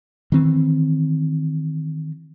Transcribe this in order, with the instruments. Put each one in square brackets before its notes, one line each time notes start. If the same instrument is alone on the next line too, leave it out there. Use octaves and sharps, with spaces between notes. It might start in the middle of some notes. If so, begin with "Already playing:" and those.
[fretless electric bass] D#3 E3 C4